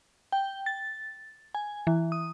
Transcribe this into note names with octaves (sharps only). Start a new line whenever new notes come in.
G5
A6
G#5
E3
D#6